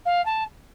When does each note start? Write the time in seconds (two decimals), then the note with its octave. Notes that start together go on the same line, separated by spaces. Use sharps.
0.06 F5
0.26 A5